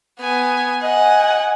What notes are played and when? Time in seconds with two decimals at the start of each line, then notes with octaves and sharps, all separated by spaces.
0.20 B3 G#5
0.83 D#5 F#5 G#5